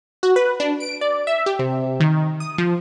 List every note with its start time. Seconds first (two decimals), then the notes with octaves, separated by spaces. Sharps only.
0.23 F#4
0.36 B4
0.60 D4
0.80 D7
1.01 D5
1.27 E5
1.46 G4
1.59 C3
2.00 D#3
2.40 D#6
2.58 F3